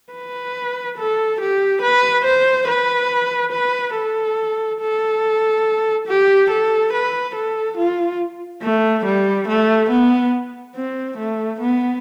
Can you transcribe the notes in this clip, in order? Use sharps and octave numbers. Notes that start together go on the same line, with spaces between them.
B4
A4
G4
B4
C5
B4
B4
A4
A4
G4
A4
B4
A4
F4
A3
G3
A3
B3
C4
A3
B3